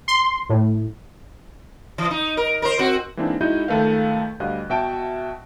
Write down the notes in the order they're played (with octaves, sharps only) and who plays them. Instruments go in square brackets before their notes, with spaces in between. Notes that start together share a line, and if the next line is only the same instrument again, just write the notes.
[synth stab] C6
A2
[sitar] E3
D#4
A#4
A#4 C5
C4 F#4
[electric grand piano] E3 G#3 A#3 C4 D4 D#4
G#3 D#4 E4 F#4 D#5 G6
C#2 D#3 A3 A4 B4 F5
D2 G3 D#5 F5 F#6
B2 F#4 E5 G5 A5 D7